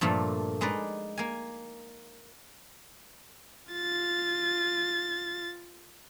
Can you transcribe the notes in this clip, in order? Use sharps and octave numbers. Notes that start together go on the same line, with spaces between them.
G2 A#2 F3 A3
G#3 D#4 B4 D5
A#3 G#5
F4 A6